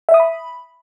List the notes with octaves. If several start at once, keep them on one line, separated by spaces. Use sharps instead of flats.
E5
D#6
B5